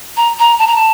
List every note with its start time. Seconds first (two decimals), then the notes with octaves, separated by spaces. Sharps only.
0.16 A#5
0.39 A#5
0.59 A5
0.67 A#5
0.75 A5